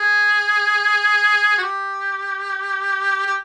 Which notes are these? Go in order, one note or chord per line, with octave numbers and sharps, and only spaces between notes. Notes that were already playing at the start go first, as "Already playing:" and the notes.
Already playing: G#4
F#4
G4
G4